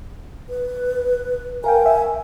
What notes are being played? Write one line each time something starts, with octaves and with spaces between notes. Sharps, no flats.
B4
A#4 F5 G5 G#5
E5